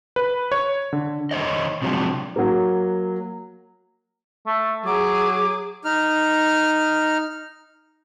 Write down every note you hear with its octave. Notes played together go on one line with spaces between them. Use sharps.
B4
C#5
D3
D#3 C5 C#5 D#5
C3 F3 F#3 G#3 D4
F#3 A#3
A3
F#3 G#4 D6
D#4 F6